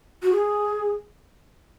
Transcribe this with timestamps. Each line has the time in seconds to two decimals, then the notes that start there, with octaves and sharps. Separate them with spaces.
0.22 F#4
0.32 G#4